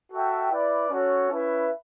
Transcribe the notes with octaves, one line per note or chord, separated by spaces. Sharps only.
F#4 A4 E5 G5
E4 B4 D5
C#4 F#4 A4 C#5
C#4 E4 B4 E5